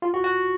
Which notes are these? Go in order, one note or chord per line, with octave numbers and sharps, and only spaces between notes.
F4
F#4
F#4